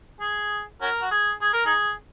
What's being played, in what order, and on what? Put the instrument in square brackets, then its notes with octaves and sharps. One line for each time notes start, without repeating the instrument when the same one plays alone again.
[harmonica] G#4
C#4 F#4 A#4
F#4
G#4
G#4
A#4
D#4 G#4